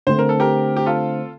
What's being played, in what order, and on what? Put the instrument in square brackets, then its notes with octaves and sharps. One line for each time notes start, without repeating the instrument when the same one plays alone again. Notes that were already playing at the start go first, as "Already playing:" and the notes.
[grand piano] D3 A3 C4 [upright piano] C5
[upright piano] A#4
A4
G4 A#4
G4
F4 A4